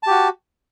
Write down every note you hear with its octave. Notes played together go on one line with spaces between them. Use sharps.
F#4 G4 A5